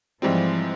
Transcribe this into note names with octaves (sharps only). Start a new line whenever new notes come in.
G#2 E3 F3 G3 C4